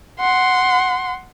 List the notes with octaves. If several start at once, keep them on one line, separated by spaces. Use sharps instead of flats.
F#5 C6